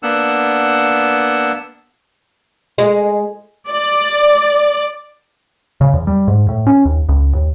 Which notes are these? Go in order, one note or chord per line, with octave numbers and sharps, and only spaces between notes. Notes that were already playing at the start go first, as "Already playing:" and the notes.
A#3 B3 D4 F#5 E6
G#3
D5
C#3
E2
G3
G#2
A2
C#4
D#2
C#2
D#2